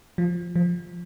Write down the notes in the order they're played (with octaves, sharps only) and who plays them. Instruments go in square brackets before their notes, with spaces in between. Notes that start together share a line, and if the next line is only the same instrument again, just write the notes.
[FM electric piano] F3
F3